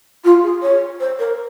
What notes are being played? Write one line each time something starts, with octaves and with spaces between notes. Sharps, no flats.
F4
G#4
C#5
C5
A#4